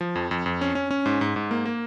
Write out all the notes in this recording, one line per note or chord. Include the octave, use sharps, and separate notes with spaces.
F3
F2
F2
F2
C#4
C#4
C#4
G#2
G#2
G#2
A#3
A#3